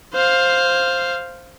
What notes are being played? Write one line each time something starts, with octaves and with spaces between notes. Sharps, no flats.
C5 F5